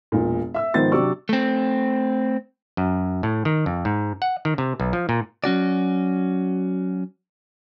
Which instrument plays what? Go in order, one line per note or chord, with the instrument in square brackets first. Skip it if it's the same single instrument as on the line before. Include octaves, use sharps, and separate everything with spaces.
[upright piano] E1 A#2
E5 E6
G#2 D#3 F3 B3 C5 A6
C3 F#3 D4 D5 C#6 E6
[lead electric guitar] A3 C4
[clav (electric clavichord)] F#2
A2
D#3
F2
G#2
F#5
D#3
C3
B1
F3
A#2
[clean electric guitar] F#3 C#4 F#4 D5